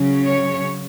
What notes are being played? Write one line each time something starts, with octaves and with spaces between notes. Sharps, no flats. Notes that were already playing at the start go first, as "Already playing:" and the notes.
Already playing: C#3 F#3 C#4
C#5